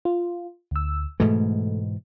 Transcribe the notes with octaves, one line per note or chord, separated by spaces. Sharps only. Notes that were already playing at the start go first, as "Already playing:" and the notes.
F4
D2 E6
G#2 B2 E3 A3